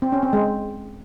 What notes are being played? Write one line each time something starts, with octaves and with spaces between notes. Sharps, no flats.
C4
C#4
C4
G#3